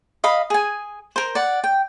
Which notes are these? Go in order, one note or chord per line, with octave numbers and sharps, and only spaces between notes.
D#5 F5 B5
G#4 G#5
A#4 C5
D5 F#5
G5